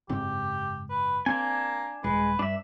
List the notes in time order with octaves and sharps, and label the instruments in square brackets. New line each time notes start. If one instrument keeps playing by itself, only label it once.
[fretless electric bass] F#1 G#2 C4 [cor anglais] G4
[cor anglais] B4
[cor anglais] A#3 [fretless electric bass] C4 [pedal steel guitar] D4 G#5
[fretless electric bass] D#1 [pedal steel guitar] G#3 [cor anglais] B4
[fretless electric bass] G2 [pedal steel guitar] D4 E5